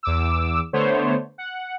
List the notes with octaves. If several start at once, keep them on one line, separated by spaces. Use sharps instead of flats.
E2 D6 E6
D3 A3 B3 C5 C#5
F#5